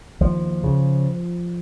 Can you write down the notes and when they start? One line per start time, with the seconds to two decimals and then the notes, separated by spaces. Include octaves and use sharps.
0.21 D#2 F3
0.64 C#3